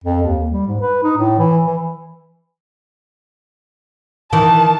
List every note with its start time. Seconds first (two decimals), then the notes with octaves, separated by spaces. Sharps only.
0.04 F2
0.23 D#2
0.51 G3
0.68 G#2
0.81 B4
1.03 D#4
1.17 A2
1.38 E3
1.67 E3
4.33 D#3 E3 A5